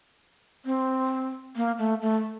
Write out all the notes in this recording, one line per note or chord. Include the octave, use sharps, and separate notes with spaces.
C4
A#3
A3
A3